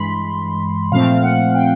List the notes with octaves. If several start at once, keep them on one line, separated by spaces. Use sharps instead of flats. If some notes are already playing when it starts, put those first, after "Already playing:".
Already playing: G2 E3 G#3 B5 C6
A#2 F3 A3 C4 F5
F#5
G5